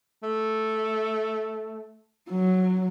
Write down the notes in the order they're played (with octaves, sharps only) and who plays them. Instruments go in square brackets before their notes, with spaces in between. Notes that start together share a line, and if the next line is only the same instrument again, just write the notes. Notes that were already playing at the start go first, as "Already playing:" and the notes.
[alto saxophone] A3
[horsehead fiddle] F#3